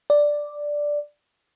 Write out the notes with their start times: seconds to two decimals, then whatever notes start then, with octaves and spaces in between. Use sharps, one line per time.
0.10 D5